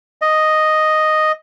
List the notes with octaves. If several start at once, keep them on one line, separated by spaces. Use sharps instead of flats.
D#5